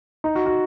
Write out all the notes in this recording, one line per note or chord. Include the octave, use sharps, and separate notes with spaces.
D#4
F#4
F#4